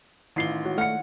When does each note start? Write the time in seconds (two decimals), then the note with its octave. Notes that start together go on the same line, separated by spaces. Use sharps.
0.36 A1 D#3 E4 F4 C7 G7
0.65 G#3 F#4 C#5
0.78 A3 F#5 F6 C#7